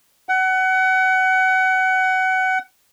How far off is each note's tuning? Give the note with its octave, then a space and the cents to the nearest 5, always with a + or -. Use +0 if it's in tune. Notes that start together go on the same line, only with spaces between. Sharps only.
F#5 +25